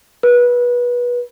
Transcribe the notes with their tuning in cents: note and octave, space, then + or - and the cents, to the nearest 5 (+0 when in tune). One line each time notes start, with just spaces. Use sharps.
B4 -25